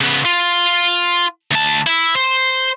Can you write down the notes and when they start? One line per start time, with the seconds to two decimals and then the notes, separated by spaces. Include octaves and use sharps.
0.01 C#3 B3
0.25 F4
1.51 D2 A5
1.87 E4
2.15 C5